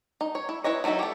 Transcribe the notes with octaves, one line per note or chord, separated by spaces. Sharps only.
D#4
C#5
E4
E4 B4 C#5 D#5
F#3 A3 B3 D#4 E4
G4 A4